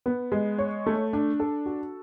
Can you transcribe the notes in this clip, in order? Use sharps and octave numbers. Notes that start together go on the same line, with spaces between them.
B3
G#3
C#5
A3
D4
A4
F#4